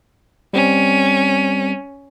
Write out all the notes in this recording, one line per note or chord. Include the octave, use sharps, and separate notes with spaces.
G3 C4 C#4